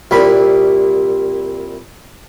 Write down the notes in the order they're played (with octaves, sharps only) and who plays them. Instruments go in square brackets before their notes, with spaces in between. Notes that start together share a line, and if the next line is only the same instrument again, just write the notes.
[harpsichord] C2 A#2 B5